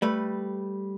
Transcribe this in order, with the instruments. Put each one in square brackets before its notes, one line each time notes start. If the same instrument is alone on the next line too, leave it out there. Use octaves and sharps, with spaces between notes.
[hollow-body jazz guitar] G3 A3 B4